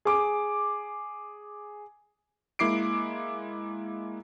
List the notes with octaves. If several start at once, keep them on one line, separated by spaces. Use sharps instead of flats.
G#4 D6
G#3 A#3 E4 D6 C7 D7